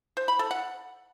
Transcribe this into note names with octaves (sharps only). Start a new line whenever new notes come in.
C5
B5
A4
F#5